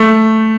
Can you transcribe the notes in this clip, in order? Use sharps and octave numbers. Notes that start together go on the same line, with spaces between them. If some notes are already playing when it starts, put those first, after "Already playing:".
Already playing: A3